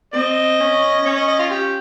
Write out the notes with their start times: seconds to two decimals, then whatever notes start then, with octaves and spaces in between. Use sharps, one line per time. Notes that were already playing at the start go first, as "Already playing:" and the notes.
0.14 C4 D#5
0.60 C#4
1.05 C#4 C#5
1.16 D#5
1.28 D#5
1.39 F4
1.50 G4